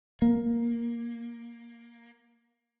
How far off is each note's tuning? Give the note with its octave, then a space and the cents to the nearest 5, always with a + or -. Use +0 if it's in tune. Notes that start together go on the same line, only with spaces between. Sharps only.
A#3 +10